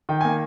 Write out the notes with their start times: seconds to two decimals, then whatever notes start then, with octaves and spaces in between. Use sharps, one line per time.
0.09 D#3 G5
0.21 A#3 G#5